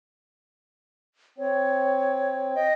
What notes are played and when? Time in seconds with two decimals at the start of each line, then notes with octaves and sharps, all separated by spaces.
1.38 C4 C#5
2.55 D#5 G5